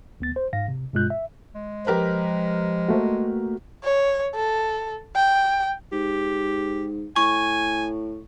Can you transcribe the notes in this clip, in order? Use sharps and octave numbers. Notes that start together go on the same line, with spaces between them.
D2 B3 A6
C5
G#2 F5 A#6
C3
G2 B2 G#3 F4 F#6 G6
E5
G#3
F3 G4 A#4 B4
A3 A#3 F#4
C#5
A4
G5
G#2 G4
A2 G#5 C#6